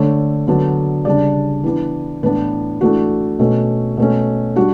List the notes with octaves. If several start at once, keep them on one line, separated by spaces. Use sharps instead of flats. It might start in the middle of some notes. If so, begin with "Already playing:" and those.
Already playing: D3 A3 D4 C#5
D3 F#3 B3 D4
C#3 G3 D4 D5
E3 B3 D4
A2 E3 B3 D4 B4
E3 A3 D4 F#4
B2 A3 C#4
B2 A3 C#4
G3 D4 F#4